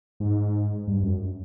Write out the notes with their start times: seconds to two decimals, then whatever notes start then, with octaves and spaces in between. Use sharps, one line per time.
0.20 G#2
0.87 G2
1.03 F#2